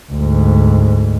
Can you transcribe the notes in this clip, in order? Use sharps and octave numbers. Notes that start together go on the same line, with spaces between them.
D2 G#2